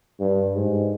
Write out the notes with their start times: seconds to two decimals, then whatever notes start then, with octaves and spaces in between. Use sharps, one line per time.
0.20 G2
0.55 G#2